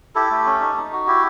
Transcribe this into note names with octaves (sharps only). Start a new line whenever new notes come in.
E4 G4 A4
A3
C#4
D#4
D#4
F#4
E4 G4